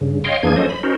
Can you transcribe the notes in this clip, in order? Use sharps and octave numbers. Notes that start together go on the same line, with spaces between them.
G2 C#3
C#5 D#5 F5 G5 C6
F2 E3 A#3 D4 G#4 G#6
F3 F#3 C#4 A4 C5 D#5
B5
C#4 D#4 F#4 A#4 C5